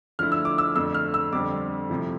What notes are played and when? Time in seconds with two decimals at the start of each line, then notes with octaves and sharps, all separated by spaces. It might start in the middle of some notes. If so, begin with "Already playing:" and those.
0.19 D3 F3 A3 E4 F6
0.32 E6
0.45 D6
0.58 E6
0.75 F2 D3 A3 E6
0.95 F6
1.14 E6
1.33 F2 D3 G3 C4 D6
1.90 C3 F3 A3 E4